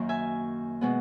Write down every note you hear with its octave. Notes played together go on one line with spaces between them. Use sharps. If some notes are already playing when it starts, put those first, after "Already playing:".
Already playing: F#2 D#3 A#3
E5 G#5
B2 G#3 B3